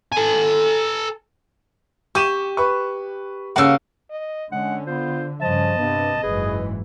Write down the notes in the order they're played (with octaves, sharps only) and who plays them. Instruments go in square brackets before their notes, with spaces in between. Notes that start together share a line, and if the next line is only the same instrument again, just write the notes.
[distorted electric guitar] A4 G#5
[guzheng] G4 [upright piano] C#6 D#7 E7
[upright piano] B4 C#6
[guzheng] C#3 A#3 [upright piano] F#5 E6
[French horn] D#5
[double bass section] D3 [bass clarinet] G#3 [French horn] C#4 [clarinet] F#5
[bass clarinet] B3 [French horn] F4 [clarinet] C5
[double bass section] G2 C#3 [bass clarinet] F3 [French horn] D#5 [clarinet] A5
[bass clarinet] G2 [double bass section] C3 B3
[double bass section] F#1 G#2 E3 [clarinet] G#4 [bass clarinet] B4